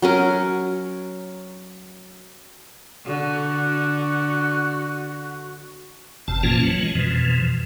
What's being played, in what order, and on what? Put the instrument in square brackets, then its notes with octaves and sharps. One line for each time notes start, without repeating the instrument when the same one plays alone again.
[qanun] F#3 C#4 A#4
[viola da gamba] D3 [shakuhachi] F#4
[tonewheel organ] G1 F2 C3 A5
A#2 E3 F3 A#3 C#4 F4
E3 F#3
G#3
F2 B2 E3 F3